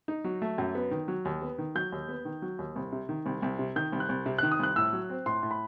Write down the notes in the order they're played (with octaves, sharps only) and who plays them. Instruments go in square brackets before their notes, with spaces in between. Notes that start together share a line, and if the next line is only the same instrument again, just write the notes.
[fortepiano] D#4
F#3
A3
F#2
B3
D#3
F#3
D#2
B3
D#3
[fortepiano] F#3 [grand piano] G6
[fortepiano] D#2
B3
D#3
F#3
D#2
C2
C3
D#3
C2
C2
C3
[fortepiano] D#3 [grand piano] G6
[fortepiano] C2
[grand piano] F#6
[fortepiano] C2
C3
[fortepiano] D#3 [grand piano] F#6
[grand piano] D#6
[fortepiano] C2 [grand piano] F#6
[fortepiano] A2 [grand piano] E6
[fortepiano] F#3
C4
[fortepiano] A2 [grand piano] C6
[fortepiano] A2
[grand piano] B5